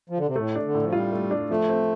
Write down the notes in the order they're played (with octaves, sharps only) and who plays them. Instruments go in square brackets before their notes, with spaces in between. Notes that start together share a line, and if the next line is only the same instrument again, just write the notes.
[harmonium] F3
D3
C3
[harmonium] A2 [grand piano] A3
[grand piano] D4
[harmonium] D3
[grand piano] A2
[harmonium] F3
[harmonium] G3 [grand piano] F4
[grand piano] A3
D4
[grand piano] F3 [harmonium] A3
[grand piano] C4